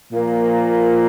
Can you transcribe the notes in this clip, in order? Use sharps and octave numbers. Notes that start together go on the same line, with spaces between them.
A#2 F3 A#3